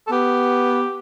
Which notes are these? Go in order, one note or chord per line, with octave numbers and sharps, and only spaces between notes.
A4
B3 G4